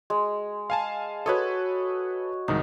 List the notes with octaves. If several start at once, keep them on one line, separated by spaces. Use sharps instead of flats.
G#3
F5 G#5 A5
F#4 A4 B4 C#5 D#5
C2 G#2 D#3 D#4